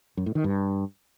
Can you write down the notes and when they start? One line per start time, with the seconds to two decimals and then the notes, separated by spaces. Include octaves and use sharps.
0.17 F#2
0.26 A2
0.35 D#3
0.44 G2